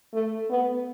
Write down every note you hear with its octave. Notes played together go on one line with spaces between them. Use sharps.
A3
B3